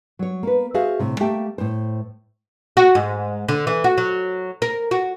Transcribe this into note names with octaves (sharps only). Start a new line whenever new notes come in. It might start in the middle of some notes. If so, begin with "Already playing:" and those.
F#3 C#5
A#3 B4
F#4 G#4 C5 E5 F5
A2 C3
A3 A#3 G4 E5 G5 A5
A2 C5
F#4
G#2
D3
E3
F#4
F#3
A#4
F#4